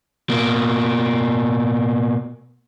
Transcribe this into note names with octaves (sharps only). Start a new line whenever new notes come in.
B2 A#3